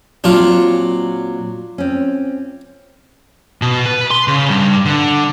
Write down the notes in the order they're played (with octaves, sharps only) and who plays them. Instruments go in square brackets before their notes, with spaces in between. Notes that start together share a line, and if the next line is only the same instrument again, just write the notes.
[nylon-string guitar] A#2 F#3 C4 [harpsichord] D4 F4
[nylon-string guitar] C4 C#4
[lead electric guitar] B2
B4
C6
C#3
G2
D3